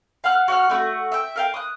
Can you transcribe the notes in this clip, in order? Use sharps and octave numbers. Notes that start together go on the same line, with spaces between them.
F5 F#5 F6 F#6
F#4 F#5 F6
A3 E4 F#4
E5 G5
A#4 F5 G5
D#6 F#6